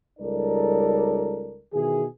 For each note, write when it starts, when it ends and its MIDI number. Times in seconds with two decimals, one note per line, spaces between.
0.19 1.60 37
0.19 1.60 55
0.19 1.60 63
0.19 1.60 69
0.19 1.60 70
0.19 1.60 74
1.73 2.05 47
1.73 2.05 51
1.73 2.05 52
1.73 2.05 68